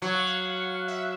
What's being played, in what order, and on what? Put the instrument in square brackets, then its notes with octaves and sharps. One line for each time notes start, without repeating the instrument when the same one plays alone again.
[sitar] F#3 [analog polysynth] F#5
[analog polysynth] F5
F#5
E5